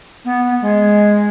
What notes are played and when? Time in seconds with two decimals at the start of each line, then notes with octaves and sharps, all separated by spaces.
0.25 B3
0.61 G#3